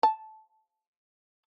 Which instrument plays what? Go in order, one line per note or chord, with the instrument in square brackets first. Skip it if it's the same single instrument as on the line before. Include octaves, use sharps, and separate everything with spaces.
[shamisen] A5